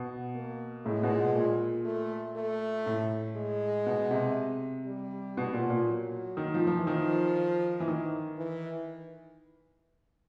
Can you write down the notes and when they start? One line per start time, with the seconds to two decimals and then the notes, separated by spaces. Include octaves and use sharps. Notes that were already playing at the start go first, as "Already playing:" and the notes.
Already playing: B2
0.35 A#3
0.85 A2 G#3
1.03 B2
1.10 A#2
1.35 A#2
1.85 A3
2.36 A3
2.86 A2
3.36 G#3
3.86 B2
4.11 C3
4.86 G3
5.37 B2
5.53 A#2
5.70 A#2
5.87 F#3
6.37 D#3
6.54 F3
6.67 F3
6.77 E3
6.87 D#3 F3
7.80 E3
7.88 D#3
8.38 E3